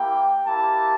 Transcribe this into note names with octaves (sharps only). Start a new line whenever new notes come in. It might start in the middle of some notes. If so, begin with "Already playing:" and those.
Already playing: A#3 E4 G4 G5
A#3 E4 G4 A5